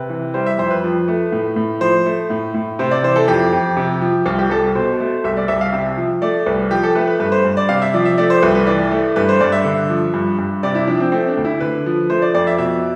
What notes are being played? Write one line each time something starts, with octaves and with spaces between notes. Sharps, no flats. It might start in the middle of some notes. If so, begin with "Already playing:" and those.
Already playing: C3 B4
E3
G3 C5
E5
F2 C5
B4
F3
A3
A2
A2
F3 C5
A3
A2
A2
C3 C5
D5
E3 C5
A4
F2 G4
F2
C3
F3
C2 F4
G4
C2 A4
B2 C5
A3
C2 E5
D5
C2 E5
F5
C3 E5
F3
A3 D5
C2 B4
F3 G4
A4
A3 B4
B4
G2 B4
C5
G2
D5
C3 F5
E5
F3 D5
E5
A3 D5
C5
C2 B4
B4
E3 D5
A3
G2 B4
C5
G2 D5
E5
D3
F3
G2
G2
C3 D5
E4
F3 D4
C4
A3 C4
D4
D2
E4
D3 B4
F3
A3 C5
D5
F2 D5
E5
B2 E5